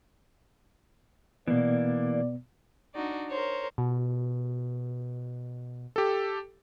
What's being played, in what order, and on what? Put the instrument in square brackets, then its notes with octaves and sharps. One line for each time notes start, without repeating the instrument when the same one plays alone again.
[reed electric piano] B2 B3 [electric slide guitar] E3 A#3 [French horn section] D5
[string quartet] D4 D#4 F#4 D5
A#4 C5 C#5
[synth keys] B2
[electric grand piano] G4 A4